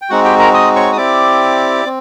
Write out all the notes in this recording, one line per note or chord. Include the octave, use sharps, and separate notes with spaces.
G5
G#3 C4 D#4 F#4 F#5
G4 G5
A#4 A#5
D#5 D#6
C#5 C#6
D#6
C4 E4 G4 D5 D6
C4